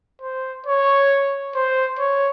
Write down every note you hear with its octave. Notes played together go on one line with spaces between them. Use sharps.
C5
C#5
C5
C#5